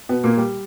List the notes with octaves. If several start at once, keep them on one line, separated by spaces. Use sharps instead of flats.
B2 B3
A#2 A#3
G3